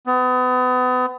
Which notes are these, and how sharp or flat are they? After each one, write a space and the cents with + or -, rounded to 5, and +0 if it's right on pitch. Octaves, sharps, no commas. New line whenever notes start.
B3 +35